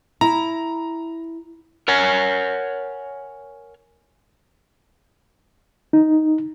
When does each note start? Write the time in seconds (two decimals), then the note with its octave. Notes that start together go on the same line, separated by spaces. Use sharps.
0.21 E4 A#5
1.88 A#4 C#5 F#5 G#5
5.93 D#4